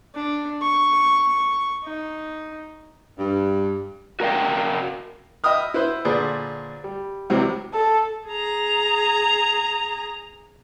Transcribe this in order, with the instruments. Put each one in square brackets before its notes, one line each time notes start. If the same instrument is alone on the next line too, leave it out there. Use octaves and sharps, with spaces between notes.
[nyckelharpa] D4
C#6
D#4
[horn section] G2
[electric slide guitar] F#4 A#4 B4 D#5 F5 G5
[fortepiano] D#5 E5 G5 B5 D#6 F6
E4 B4 C5
A#2 D3 G#4 B4 C5
G3
C#2 C3 E3 F#3 G3 C5
[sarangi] A4
[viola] G#4 A#5